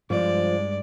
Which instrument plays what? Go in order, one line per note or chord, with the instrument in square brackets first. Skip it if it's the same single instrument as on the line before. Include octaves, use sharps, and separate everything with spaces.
[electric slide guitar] G2 G#3 [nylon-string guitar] F3 [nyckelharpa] D5